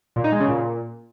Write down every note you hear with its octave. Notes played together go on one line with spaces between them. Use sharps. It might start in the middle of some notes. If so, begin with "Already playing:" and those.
A#2
D#4
G#3
C#3
A#2